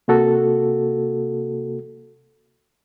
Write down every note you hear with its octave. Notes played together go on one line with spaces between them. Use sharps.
C3 A#3 F#4 A4